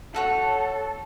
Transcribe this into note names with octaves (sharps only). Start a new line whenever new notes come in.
A3 F#4 A4 C#5